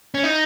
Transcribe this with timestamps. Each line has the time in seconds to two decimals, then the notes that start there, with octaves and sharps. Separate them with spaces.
0.14 C#4
0.23 D#4